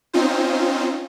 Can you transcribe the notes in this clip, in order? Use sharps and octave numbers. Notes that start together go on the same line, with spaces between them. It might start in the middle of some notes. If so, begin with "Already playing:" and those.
C4 C#4 D#4 F4 C5